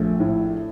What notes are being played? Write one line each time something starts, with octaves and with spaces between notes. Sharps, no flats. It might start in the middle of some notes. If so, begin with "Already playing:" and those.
Already playing: A#1 A3
A2